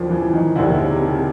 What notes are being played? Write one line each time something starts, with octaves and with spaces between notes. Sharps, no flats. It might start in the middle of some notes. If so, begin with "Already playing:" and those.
Already playing: D#2 C#3 F3 D4
E3
D#3
D#2 D3 D#3 G3 C4 E4
C#3
C3
C3